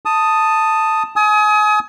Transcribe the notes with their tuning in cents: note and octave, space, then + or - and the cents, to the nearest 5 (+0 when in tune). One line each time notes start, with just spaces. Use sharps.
A5 +5 D#6 +0
G#5 +35 D#6 +30